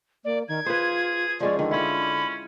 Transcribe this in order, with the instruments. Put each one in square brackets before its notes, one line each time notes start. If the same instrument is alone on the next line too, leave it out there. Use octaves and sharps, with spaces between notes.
[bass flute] A#3 [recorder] D5
[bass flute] D#3 [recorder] G#6
[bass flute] F4 [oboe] G#4 [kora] B4 C5
[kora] F3 G#3 C#4 [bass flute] D5
[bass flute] D3 [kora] D#3
[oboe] C#4 [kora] E4 F4 [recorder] B5